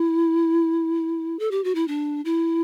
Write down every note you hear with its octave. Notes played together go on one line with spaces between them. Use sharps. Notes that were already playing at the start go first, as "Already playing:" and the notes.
Already playing: E4
A4
G4
F#4
E4
D4
E4